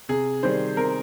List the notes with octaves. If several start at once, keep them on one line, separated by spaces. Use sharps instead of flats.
C3 G#4
D#3 G3 C5
C3 A#4